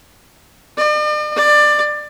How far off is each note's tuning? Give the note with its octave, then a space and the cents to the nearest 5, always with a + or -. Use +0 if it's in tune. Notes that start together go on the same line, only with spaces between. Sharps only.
D5 +45
D5 +20